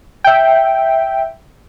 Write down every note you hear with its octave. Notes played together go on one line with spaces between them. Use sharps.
E5 G5